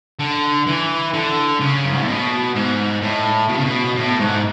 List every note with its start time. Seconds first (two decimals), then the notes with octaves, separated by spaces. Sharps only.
0.19 D3
0.66 E3
1.13 D3
1.60 C#3
1.85 F#2
1.92 G#2
2.00 A2
2.08 B2
2.55 G#2
3.02 A2
3.49 B2
3.57 C#3
3.65 B2
3.96 A2
4.20 G#2